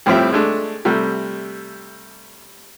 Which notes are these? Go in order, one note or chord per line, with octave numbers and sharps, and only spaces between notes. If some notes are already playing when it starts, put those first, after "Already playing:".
C2 A2 F3 C4 G4 E5
G#3 A3 D4
C3 G3 A3